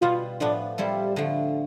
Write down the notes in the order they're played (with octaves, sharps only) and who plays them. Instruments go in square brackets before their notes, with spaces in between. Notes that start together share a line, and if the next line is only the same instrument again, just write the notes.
[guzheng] B2 G3 B3 [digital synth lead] F4
[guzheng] A2 F3 B3 [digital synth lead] D4
[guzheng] F3 C4 E4 A4 [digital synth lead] G3
[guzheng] D3 F3 A3